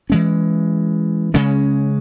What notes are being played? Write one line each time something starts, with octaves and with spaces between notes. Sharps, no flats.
E3 G#3 C#4
C#3 G#3 C#4